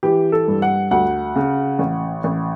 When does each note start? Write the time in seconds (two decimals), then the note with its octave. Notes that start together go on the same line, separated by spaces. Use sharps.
0.03 E3 G4
0.32 A4
0.48 G2
0.62 F#5
0.91 D2 F#5
1.36 C#3
1.79 A1
2.24 A1